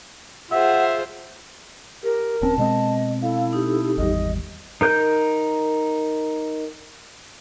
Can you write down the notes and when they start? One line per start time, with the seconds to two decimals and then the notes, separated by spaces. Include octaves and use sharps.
0.52 F4 G#4 C5 E5 F#5
2.03 G4 A#4
2.42 D#1 C4 C#4 A5
2.58 B2 G#3 C4 D#5
3.22 E4 A4 F5
3.53 D#4 G4
3.98 G#1 E2 G3 D#5
4.81 D#4 A#4 G6